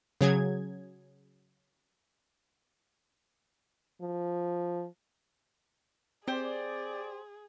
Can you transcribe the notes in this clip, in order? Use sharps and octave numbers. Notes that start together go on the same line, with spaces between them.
C#3 F#3 G#4 G#6
F3
C4 G4 G#4 C5 D5